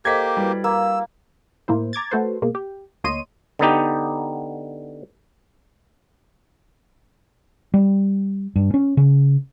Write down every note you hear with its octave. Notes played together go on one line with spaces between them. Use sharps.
A#3 G4 A4 C5 D#5 G#6 B6
G3 E4 F#4 B4
A#3 E6
A2 A#3 E4 C5
A#5 D6 G#6 A6
A3 F#4 A4 B4 C5
B2 G#3 A#3
G4
D2 A#3 C#5 D#5 C6 D#7
D3 B3 D#4 G4
G3
G2
C#4
C#3